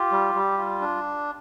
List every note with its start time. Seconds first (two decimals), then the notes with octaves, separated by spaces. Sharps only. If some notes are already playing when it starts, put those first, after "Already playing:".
Already playing: F4 G4
0.12 G3
0.35 G3
0.58 F4
0.81 D4